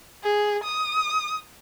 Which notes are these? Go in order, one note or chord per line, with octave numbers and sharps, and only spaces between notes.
G#4
D#6